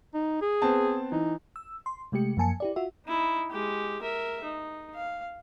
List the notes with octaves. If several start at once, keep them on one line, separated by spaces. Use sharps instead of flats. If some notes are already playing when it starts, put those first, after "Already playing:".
D#4
G#4
B3 C4 A5
E3 D#4
E6
C6
C3 G#3 A3 G4 C#7
F#2 F3 A#3 G#5 A5 C#7
E4 G4 D5
F4 F#4 E5
D#4 E4
G#3 G4
A#4 E5
D#4
F5